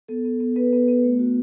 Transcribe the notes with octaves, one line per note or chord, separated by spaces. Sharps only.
B3 A4
B3
B3
B3 B4
B3
B3
A3
F#4